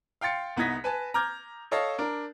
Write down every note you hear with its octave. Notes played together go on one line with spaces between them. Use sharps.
F5 G5 C6 A6 C#7
C2 B3 D#4 G#6 A#6 B6
B4 G#5 A5
A#5 D6 F6 G6 G#6
A4 C#5 D#5 F5 A5
D4 A#4